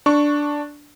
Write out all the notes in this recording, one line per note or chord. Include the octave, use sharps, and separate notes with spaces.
D4 C#6